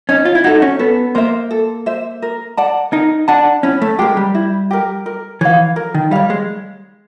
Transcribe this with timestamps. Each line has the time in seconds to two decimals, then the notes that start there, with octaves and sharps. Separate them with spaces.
0.09 C#4 D#4
0.25 F4
0.35 E4
0.44 D#4 F#4 A4
0.62 C#4
0.79 B3 A4
1.15 A#3 C5 E5
1.51 A4
1.86 C5 E5
2.22 A#4
2.57 D5 F#5 A5
2.92 D#4 A#4
3.28 D4 D5 F#5 A5
3.63 C#4 E4
3.82 A3
3.99 G#3 G4 A#4
4.17 G3
4.35 E4
4.71 G4 A#4
5.06 A#4
5.41 E3 C#5 F5
5.76 A#4
5.95 D#3
6.11 G3 C#5 F5
6.30 G#3